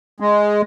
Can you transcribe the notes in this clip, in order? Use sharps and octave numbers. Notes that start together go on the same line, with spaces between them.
G#3